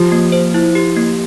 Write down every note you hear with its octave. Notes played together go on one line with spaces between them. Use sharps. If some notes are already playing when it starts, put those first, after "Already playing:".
Already playing: F3 G4
A#3
C5
E4
G4
A#3